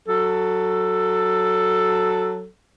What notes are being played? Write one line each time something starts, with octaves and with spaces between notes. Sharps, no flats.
F#3 A4